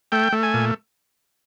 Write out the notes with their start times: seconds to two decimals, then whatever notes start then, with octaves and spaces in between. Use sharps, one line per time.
0.12 A3 G5
0.33 A3
0.43 G#5
0.54 A#2